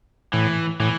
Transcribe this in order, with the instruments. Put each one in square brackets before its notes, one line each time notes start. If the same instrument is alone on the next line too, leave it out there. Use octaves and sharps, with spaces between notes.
[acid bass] A2 [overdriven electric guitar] E3
[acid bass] A2 [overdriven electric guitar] E3